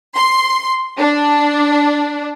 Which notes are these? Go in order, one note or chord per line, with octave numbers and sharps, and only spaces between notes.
C6
D4